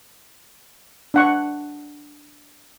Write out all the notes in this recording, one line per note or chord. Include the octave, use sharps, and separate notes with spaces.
D4 F#5 C#6